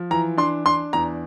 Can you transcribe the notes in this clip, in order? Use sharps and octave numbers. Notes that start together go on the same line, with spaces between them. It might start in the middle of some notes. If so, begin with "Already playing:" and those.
Already playing: F3
E3 A#5
D4 C6
D4 C6
E2 A#5